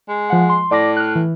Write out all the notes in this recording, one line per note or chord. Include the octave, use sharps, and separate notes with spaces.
G#3
F3 F#5
C6
A2 D5 D6 A#6
F6 F#6
E3